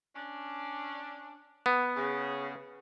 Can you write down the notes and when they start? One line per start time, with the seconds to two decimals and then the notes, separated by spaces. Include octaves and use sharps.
0.15 C#4 D4
1.66 B3
1.96 C#3